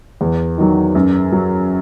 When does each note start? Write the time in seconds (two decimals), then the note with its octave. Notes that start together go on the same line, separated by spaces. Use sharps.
0.21 E2
0.58 D#3 F#3
0.95 F#2
1.32 F#3